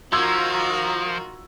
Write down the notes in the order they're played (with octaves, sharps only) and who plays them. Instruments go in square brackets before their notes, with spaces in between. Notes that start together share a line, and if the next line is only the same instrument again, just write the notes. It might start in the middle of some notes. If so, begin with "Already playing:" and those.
[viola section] D#3 F4 A#5 [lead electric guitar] F3 [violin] F#4 [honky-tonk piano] C6 E6 G#6